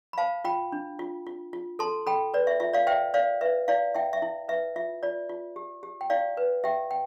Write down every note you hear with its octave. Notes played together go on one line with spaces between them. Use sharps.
B5
C5 F5 A5
F4 G5 B5
D4
F4
F4
F4
A4 A5 C6
A4 G5 B5
B4 D5
E5
F4 E5
D5 F5
C5 E5 G5
C5 D5 F5
B4 E5
E4 D5 F5
E4 E5 G5
E5
E4
B4 E5
F4 E5
F4 D5
F4
G4
G4
G5
E4 D5 F5
B4
G4 E5 G5
G5